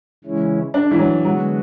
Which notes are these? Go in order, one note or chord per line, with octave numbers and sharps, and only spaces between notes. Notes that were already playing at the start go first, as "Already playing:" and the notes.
C#3 E3 G#3 C#4 E4
D4
E3
F#3
D3 F#3 G#3 B3 F#4